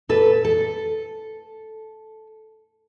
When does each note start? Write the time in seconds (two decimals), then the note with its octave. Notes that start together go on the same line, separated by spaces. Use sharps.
0.09 A#2 A4 B4
0.45 A4